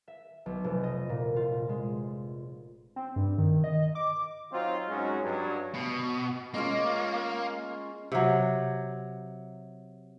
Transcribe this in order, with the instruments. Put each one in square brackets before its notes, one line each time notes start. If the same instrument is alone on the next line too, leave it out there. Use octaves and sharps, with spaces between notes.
[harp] E5
B1
F1
D#5
A#2
F4
G#3
[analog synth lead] C4
G2
D#3
D#5
D6
[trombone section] F#3 C4 D#4 F4
F#2 G#3 C#4 D#4 F#4
G2 F#3
[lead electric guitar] B2
[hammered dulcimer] G#3 C#4 F4 [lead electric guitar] A#3
[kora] C3 F#3